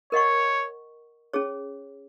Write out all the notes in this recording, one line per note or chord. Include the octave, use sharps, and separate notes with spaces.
A#4 C#5 D#5 F#5 C#6
C#4 G#4 C#5